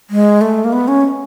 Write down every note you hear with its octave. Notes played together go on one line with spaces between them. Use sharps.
G#3
A3
A#3
B3
C#4